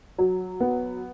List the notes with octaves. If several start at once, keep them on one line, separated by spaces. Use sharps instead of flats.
F#3
B3